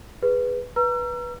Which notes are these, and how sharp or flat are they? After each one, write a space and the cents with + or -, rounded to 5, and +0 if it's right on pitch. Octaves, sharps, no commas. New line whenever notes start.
G#4 -15 B4 +0
B4 -15 A#5 +10 E6 +45